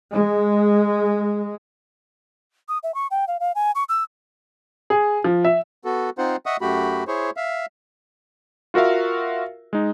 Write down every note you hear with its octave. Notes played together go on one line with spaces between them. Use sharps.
G#3
D#6
E5
C#6
G5
F5
F5
G#5
C#6
E6
G#4
F3
E5
B3 F#4 A4
C4 D#4 F4 C5 F#5
D#5 E5 F#5 C#6 D#6
F#2 A3 F#4 G4 B5
E4 G#4 C5 C#5 C#6
E5 F5
F4 F#4 A#4 E5 F5
G#3 D#4